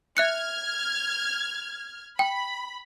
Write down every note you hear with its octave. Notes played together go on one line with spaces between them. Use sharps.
E5 F6 F#6 G#6 C#7
G5 B5